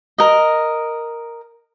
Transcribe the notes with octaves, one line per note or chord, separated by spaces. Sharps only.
A#4 D#5